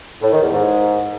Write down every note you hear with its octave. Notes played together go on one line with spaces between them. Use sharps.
A2
D#3
E2
G#2